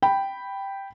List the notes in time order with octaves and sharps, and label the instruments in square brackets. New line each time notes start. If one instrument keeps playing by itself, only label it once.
[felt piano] G5 B5